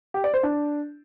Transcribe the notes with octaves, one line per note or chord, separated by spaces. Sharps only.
G4
D5
C5
D4